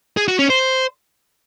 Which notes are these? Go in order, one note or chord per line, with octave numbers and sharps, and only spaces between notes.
G#4
F#4
C#4
C5